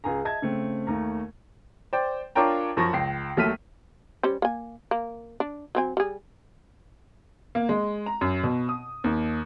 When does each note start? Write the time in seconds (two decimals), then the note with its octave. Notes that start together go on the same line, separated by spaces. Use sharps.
0.04 C#2 G#4 G#5 A#5
0.25 D#5 E5 A5 G#6
0.42 C#3 A3 C4
0.87 D#2 A3 A#5
1.93 C5 D5 G5
2.35 D4 F4 A#4 C#5 G5 A#5
2.77 F#2 F3 C#6 A#6
2.93 C#2 G5 C7
3.37 D#2 F#3 A3 F6 B6 D#7
4.23 G3 C#4 C5
4.42 A#3 G#5
4.91 A#3
5.40 D4
5.75 F#3 C4 G#5
5.97 G3 G#4
7.55 A#3
7.69 G#3
8.06 A#5
8.21 F#2
8.43 B2
8.69 D#6
9.04 D#2